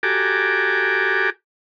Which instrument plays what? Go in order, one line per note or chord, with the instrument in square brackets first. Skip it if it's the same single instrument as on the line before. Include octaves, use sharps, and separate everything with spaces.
[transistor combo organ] F#4 G4 A4 G#5 A#5 D6